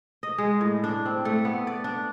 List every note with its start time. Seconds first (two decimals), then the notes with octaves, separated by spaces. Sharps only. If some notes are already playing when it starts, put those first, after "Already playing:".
0.23 D#5
0.38 G#3
0.61 A2
0.84 D4
1.06 C4
1.25 A3
1.45 B3
1.67 D5
1.84 D4